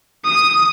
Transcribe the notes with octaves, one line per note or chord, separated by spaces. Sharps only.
D#6